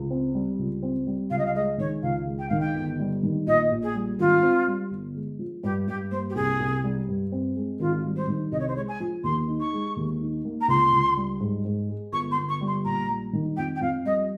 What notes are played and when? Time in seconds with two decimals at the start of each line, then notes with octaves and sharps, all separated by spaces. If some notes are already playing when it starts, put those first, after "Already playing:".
Already playing: C#2
0.11 C4
0.34 G3
0.59 C#2
0.83 C4
1.07 G3
1.30 C#2 F5
1.38 D#5
1.46 F5
1.55 G#3 D#5
1.78 D#3 C#5
2.03 C#2 F5
2.27 G#3
2.39 G5
2.49 D#3 F5
2.60 G5
2.75 G1
2.99 G3
3.23 D#3
3.47 A#1 D#5
3.71 A#1
3.83 G#4
3.95 G3
4.19 G#1 F4
4.43 C4
4.67 G3
4.91 G1
5.15 G#3
5.39 F3
5.63 G2 G4
5.88 G2 G4
6.11 A#3 C5
6.29 G4
6.35 C2 G#4
6.60 C2
6.84 G3
7.08 G2
7.32 C4
7.56 G#3
7.80 G#1 F4
8.04 G3
8.16 C5
8.28 D#3
8.52 C2 D#5
8.59 C#5
8.68 C5
8.76 G#3 C#5
8.88 G#5
9.00 F3
9.24 D#2 C6
9.48 D#4
9.60 C#6
9.73 G#3
9.96 D#2
10.21 D#4
10.45 A#3
10.61 A#5
10.68 C#2 C6
10.92 C#2
11.17 G3
11.40 G#2
11.65 G#2
11.89 G#3
12.12 G1 C#6
12.31 C6
12.37 G1
12.49 C#6
12.61 G3
12.67 C6
12.85 A#1 A#5
13.09 G3
13.33 D#3
13.56 F2 G5
13.76 G5
13.81 F2 F5
14.05 G3 D#5